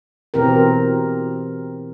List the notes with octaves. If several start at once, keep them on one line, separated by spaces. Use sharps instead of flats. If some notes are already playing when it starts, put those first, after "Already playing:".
B2 E3 C4 G4 A#4